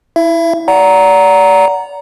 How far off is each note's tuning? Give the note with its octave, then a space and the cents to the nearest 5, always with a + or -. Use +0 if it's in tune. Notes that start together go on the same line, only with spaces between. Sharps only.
E4 -10 E5 +30
D5 -30 F#5 +0 A#5 +0